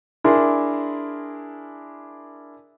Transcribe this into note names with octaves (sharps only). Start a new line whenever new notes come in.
D4 E4 G#4 A#4 C6